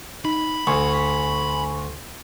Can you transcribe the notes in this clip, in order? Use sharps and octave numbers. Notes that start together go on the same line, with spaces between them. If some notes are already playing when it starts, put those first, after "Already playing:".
D#4 B5
D2 G#5 C6 C#6